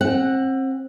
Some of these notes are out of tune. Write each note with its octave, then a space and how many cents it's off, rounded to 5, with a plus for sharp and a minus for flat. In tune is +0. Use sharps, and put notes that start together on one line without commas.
C4 +30 F#5 +0